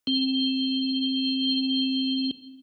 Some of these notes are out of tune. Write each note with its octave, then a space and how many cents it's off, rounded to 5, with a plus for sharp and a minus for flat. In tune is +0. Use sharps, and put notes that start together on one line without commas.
C4 +15